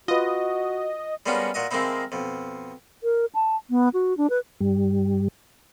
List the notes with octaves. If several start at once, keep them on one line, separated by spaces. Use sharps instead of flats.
F4 F#4 B4 D#5
G3 G#3 A#3 B3 C#4 G5
A#2 F#4 D#5 D#6
D#3 G#3 A#3 C4 D#4 E4
F2 B2
A#4
A5
B3
F#4
D4
B4
G2 G3